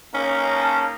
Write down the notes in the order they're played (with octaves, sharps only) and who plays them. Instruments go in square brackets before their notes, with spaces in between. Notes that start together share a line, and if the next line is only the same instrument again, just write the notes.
[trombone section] C#3 A#3 D#4 [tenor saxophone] C#4
[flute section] A5